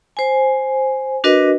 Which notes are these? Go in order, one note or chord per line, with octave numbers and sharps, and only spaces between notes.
C5 G#5
D4 F#4 A#4 B4 D#5